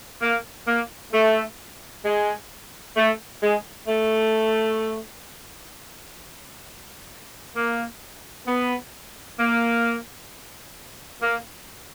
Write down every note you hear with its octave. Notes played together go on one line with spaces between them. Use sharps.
A#3
A#3
A3
G#3
A3
G#3
A3
A#3
B3
A#3
A#3